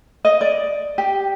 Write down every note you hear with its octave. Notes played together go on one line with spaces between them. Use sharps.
D#5
D5
G4